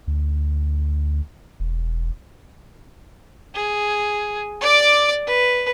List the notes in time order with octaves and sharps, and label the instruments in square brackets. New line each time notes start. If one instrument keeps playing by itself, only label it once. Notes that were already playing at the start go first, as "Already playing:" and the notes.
[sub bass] D2
E1
[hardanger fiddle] G#4
D5 D6
B4